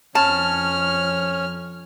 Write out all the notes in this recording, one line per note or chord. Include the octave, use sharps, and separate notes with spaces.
F2 C#4 C#5 A5 F6